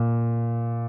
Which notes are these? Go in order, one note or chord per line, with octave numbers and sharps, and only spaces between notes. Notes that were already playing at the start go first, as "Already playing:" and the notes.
Already playing: A#2